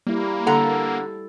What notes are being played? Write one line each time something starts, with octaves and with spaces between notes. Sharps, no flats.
G3 A#3 E4
D3 A4 F#5 A#5